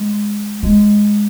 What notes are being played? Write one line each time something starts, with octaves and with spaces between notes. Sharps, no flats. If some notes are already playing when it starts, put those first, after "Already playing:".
Already playing: G#3
G#3